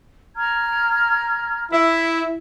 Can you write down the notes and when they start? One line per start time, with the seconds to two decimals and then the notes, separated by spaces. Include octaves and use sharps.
0.36 A#5 F6 G#6
1.72 E4